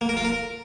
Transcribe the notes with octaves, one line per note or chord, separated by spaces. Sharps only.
A#3
A#4
F4
A#4